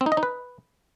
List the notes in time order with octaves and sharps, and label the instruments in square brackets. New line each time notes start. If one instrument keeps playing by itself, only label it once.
[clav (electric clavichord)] C4
D#4
D#5
D#4
B4